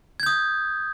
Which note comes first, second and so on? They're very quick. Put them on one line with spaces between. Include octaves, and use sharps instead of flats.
G#6 G6 D#6